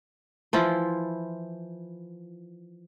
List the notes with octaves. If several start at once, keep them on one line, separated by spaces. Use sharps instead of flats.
E3 F3 E4 F4